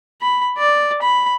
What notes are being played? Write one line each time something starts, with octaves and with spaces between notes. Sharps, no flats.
B5
D5
B5